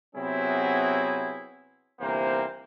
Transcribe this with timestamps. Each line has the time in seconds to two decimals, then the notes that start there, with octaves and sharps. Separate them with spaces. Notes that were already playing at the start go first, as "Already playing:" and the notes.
0.16 C3 F#3 B3 C4 E4 G#4
2.00 G1 C3 E3 A#3 C5